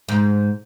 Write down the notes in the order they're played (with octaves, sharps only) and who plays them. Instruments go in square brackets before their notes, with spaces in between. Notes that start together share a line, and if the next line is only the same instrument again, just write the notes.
[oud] G#2